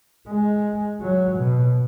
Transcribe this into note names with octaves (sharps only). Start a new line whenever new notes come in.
G#3
F#3
B2